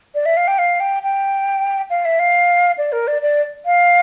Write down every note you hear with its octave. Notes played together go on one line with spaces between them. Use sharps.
D5
E5
F5
G5
F5
G5
G5
F5
E5
F5
D5
A#4
D5
D5
F5